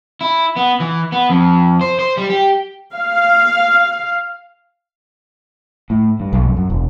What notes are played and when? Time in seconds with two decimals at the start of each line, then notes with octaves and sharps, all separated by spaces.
0.21 E4
0.56 B3
0.80 E3
1.12 B3
1.30 F2
1.81 C5
1.99 C5
2.17 G3
2.30 G4
2.94 F5
5.90 A2
6.20 G2
6.33 B1
6.45 F#2
6.57 F#2
6.70 E1